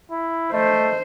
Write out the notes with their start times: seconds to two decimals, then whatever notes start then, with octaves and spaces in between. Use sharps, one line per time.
0.11 E4
0.52 A3 C5 D#5